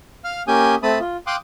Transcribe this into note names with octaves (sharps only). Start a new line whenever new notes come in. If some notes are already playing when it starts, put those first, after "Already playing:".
F5 F6
A#3 C#4 G4 G#5 D#6 G6
A3 C4 A5 B5 D#6
F4
F5 G5 C6 D6 D#6 F#6